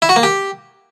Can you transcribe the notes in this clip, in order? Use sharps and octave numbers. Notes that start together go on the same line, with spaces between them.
E4
F#4
A#3
G4